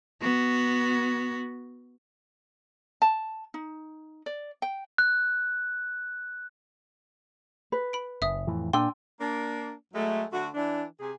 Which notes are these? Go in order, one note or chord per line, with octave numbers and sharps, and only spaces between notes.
B3 F#4
A5
D#4
D5
G5
F#6
B4
B5 D7
F#1 E5 D#6
F2 A2 E3
A#2 D4 G5 G#5 C6 E6
A#3 D4
F#3 G#3 A3
D3 A3 F#4
E3 D4
C3 G4 G#4